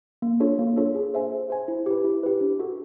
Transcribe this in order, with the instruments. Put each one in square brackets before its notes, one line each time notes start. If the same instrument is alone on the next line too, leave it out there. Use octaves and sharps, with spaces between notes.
[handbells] A#3
D4 F4 A4 C#5
A#3
D4 F4 A4 C#5
G#4
C5 E5 G#5
G#4
C5 E5 G#5
E4
G4 B4
E4
G4 B4
D4
F#4 A4